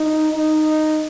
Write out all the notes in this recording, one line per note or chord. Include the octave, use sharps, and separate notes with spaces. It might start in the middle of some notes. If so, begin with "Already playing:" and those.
Already playing: D#4
D#4